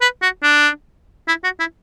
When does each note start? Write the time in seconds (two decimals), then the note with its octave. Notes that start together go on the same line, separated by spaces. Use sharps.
0.01 B4
0.22 F#4
0.43 D4
1.28 E4
1.44 F#4
1.59 E4